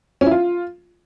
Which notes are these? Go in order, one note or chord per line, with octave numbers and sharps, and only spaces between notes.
C#4
E4
F4